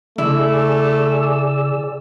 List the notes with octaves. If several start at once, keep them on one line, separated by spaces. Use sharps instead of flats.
C#3 A3 E4 G#4 D5 E6